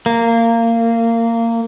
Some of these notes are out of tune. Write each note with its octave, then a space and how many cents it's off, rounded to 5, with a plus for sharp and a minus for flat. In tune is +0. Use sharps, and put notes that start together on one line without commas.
A#3 -20